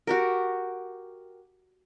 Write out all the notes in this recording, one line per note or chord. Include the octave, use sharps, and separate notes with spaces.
F#4 G4 A#4